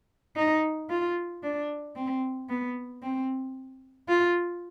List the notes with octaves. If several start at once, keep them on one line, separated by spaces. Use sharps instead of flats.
D#4
F4
D4
C4
B3
C4
F4